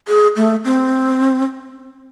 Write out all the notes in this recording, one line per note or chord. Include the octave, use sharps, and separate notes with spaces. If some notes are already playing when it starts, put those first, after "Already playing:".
G#4
A3
C4